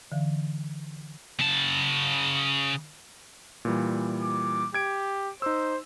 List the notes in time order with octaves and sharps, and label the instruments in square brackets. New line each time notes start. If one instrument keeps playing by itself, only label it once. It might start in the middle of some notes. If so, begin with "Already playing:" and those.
[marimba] D3 E3 F5
[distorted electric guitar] C#3 A5
[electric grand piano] A#2 E3 G3
[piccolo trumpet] D6
[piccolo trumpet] G4 [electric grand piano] G#6 D7
[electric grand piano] D#4 E6 [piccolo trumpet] C5